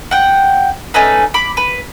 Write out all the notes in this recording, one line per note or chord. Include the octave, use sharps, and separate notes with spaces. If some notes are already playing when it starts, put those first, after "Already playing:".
F#5 G5
A3 C#4 D#4 B4
B5 D6
B4